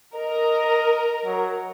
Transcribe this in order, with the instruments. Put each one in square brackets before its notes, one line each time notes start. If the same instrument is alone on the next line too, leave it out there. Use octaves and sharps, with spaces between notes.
[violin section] A#4 [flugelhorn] D#5
[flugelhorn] F#3